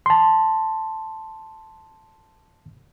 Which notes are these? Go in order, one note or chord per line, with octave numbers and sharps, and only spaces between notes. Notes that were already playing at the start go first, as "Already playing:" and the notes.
A5 C6